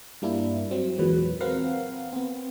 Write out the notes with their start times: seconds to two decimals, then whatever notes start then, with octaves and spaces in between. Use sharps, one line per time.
0.22 G2 G3 A#3 D4 E4
0.71 F#3 C4
0.98 E2 A#2 F#3 G#3 B4
1.40 C4 A#4 B4 F5 F#5
2.12 B3 C4